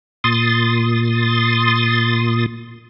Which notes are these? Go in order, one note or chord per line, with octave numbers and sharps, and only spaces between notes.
A#2 C6 D#6 A6